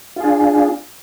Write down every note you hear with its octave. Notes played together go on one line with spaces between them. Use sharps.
D4 F4 G#4